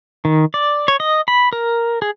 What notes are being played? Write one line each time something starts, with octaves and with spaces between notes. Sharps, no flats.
D#3
D5
C#5
D#5
B5
A#4
G#4